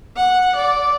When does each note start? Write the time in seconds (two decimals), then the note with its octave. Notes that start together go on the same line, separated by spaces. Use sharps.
0.16 F#5
0.55 D5